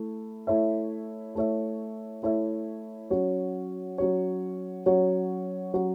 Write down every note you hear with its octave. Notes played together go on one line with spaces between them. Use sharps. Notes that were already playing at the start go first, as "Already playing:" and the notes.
Already playing: A3 E4
A3 E4 C#5 E5
A3 E4 C#5 E5
A3 E4 C#5 E5
F#3 C#4 F#4 C#5
F#3 C#4 F#4 C#5
F#3 C#4 F#4 C#5
F#3 C#4 F#4 C#5